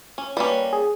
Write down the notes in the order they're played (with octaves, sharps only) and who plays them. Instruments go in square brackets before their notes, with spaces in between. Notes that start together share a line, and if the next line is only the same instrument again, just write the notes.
[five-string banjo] C#4
[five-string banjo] G3 A#3 C#4 [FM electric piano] B4
[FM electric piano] G#4